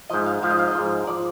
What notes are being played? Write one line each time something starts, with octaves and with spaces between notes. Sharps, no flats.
G#2 F3 D#5
F5
G#2 F3 F5
D#5
F5
D#5
G#2 F3
F3 D5